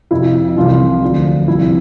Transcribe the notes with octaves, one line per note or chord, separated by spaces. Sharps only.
F2 C3 F3 E4
C2 C3 E3 F4
D2 D3 F3
C2 C3 F3 E4